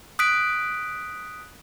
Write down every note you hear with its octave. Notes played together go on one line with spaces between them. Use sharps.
D#6 F#6 B6 D7